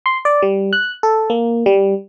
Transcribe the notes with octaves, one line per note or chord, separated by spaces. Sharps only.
C6
D5
G3
F#6
A4
A#3
G3